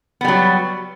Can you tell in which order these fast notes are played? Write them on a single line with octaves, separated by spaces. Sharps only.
B3 G3 F#3